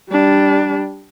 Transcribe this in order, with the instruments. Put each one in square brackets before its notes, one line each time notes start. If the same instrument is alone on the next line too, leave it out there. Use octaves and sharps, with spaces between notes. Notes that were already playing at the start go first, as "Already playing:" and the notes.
[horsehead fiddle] G3 D4